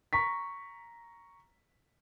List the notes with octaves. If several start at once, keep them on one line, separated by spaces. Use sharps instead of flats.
A#5 C#6 B6